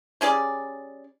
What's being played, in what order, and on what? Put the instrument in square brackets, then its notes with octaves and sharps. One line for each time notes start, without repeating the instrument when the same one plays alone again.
[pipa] G3 C#4 G#4 D5